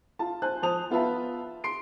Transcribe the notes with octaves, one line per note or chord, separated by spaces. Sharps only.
F4 A5
C5 G#5 A5 F#6
F3 C5 A5 D#6 F7
B3 F4 B4 E5 A5
C6 C7 D7